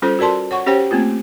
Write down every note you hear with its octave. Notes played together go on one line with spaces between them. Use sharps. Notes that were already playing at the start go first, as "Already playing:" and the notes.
G3 C#4 F4 A4 C5
F#4 A#4 D5 A5 C6
C#5 F#5 C#6
C#4 G4 C5 C#5 G5
A3 A#3 C4 F4